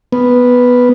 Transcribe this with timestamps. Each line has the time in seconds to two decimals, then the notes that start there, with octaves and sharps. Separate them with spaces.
0.12 B3